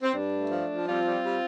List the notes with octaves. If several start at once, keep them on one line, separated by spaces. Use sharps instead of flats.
C4
G2 D4
A3
F3
F3
G3 C4 F4
G3
G3